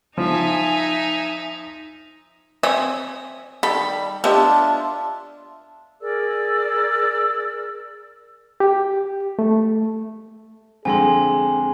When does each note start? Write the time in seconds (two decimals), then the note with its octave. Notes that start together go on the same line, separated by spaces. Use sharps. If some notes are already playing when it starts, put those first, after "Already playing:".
0.18 F3 D#4 E5 G#5
2.63 C4 C#4 E5 D#6
3.63 D#3 G3 A4 B5
4.24 B3 D4 F4 G4 D#5 E5 A5
6.01 G#4 A#4 D5 E6
8.60 G4
9.39 A3
10.85 F2 D3 G#3 C4 G#4 G#5 C6